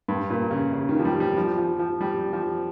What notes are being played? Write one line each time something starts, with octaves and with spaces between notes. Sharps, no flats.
G2
A#2
C#3
C#3
D#3
F3
G3
G3
F3
F3
F3
G3
F3